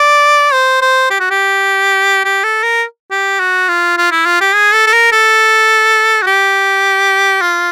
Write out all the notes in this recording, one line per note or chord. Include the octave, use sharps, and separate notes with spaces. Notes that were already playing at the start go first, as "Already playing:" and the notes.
Already playing: D5
C5
C5
G4
F#4
G4
G4
A4
A#4
G4
F#4
F4
F4
E4
F4
G4
G#4
A4
A4
A#4
A4
F#4
G4
F4